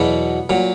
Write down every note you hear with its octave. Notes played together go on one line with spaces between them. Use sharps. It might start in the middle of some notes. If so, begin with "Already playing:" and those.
Already playing: E2 B2 F#3 B3
A#2 F#3